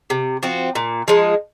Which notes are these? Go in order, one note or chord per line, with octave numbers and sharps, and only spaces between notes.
C3
F3 C4 F#4
A#2
F3 G#3 D#4